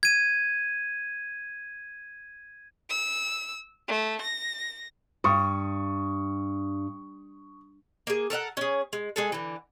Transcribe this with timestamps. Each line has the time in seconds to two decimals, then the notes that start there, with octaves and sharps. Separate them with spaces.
0.03 G#6 D#7
2.90 E6
3.88 A3
4.21 A#6
5.24 G2 C#6 D#6
8.07 A#3 G#4
8.30 A4 A#4 E5 F#5
8.57 C#4 G#4
8.93 G#3
9.16 G#3 G#4 A4
9.32 D3 E3